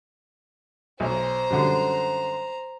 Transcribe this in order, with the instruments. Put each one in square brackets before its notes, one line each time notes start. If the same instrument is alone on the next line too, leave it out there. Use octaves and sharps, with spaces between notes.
[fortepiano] B1 [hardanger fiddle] C5 A#5
[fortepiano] F#2 D3 G3